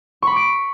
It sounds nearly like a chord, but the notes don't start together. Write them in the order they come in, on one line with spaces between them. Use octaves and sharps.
C#6 B5 D6 D7